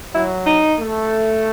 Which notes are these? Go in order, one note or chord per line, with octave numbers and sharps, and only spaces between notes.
F#3 E4
D#4
A3